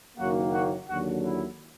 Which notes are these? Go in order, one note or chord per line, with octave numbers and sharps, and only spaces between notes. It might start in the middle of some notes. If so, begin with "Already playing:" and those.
F#1 F#2 D#3 F#3 A#3 F#4
F#4
D#2 D3 F#3 F#4
E4